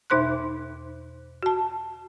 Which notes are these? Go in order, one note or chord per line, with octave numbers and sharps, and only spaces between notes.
E2 B2 D#4 C5 C6 F#6
F#4 A5